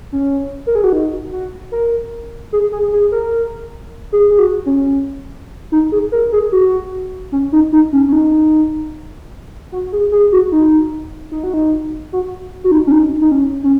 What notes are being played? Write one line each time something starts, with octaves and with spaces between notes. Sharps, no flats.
C#4
A#4
G#4
F#4
D#4
F#4
A#4
G#4
G#4
G#4
A#4
G#4
G#4
F#4
C#4
D#4
G#4
A#4
G#4
F#4
C#4
D#4
D#4
C#4
C#4
D#4
F#4
G#4
G#4
F#4
D#4
D#4
F#4
D#4
F#4
F#4
D#4
C#4
D#4
D#4
C#4
C#4